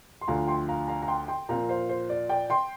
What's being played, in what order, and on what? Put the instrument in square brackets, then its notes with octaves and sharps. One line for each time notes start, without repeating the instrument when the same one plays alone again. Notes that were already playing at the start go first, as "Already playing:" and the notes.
[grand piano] C6
D2 D3 F3 D4 F5 A#5
G5 C6
F5 A#5
F5 A#5
A#5
G5 C6
G5 C6
A#2 F3 C4 F5 A#5
C5 F5
C5
D5
D5 G5
G5 C6